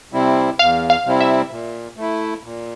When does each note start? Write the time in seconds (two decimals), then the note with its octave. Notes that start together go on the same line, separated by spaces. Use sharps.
0.13 C3 G3 C4 E4
0.59 E2 F5
0.90 F5
1.05 C3 G3 C4 E4
1.20 E5
1.51 A#2
1.97 A3 E4
2.43 A#2